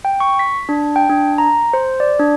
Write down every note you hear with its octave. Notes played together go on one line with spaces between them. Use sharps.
G5
C#6
B6
D4
G5
D4
A#5
C5
D5
D4